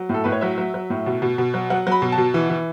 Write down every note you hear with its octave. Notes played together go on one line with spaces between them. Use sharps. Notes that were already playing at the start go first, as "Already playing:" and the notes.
Already playing: F#3
A2 A4
A2 B4
C#5
F#3 E5
F#3
F#3
A2
B2
B2
B2
F#3
F#3 F#5
F#3 B5
B2
A5
B2
E3
E3